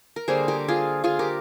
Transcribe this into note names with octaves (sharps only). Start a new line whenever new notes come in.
A#4
D3 G3 A#3 G#4 C5
G4 A#4
F4 G#4
F4 G#4
G4 A#4